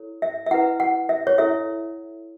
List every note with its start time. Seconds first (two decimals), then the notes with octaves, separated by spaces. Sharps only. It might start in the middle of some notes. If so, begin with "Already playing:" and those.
Already playing: E4 A4 C#5
0.22 E5
0.46 E5
0.51 E4 B4 F#5
0.80 F#5
1.09 E5
1.27 C#5
1.38 E4 A4 C#5 E5